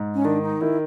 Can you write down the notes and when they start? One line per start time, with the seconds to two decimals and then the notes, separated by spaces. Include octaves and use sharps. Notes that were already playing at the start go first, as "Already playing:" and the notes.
Already playing: G#2
0.14 C#4
0.24 D#3 D4
0.43 D#4
0.61 D#3 E4